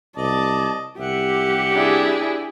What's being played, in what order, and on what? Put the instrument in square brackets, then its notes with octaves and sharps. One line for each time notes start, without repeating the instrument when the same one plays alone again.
[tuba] C2 [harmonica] D5 D#5 [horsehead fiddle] A5
[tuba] C2 [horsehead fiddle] G4 [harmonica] E5 F#5
[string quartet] D4 E4 G#4